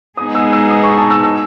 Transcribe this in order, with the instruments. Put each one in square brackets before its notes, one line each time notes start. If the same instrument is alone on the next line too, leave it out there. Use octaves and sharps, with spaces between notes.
[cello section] G#3 B3 D#4 G#4 [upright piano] D#6
[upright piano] E6
E6
D#6
C#6
A5
E6
E6